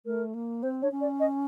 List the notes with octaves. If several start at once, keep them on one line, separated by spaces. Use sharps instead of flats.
A3 A#4
A#3
C4 C5
D4 C#5
C#4
D5
D#5